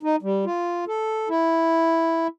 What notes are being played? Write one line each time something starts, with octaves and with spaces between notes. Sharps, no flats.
D#4
G3
F4
A4
E4